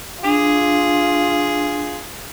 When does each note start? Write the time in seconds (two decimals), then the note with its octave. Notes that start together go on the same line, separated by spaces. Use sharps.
0.24 D4 F4 G#4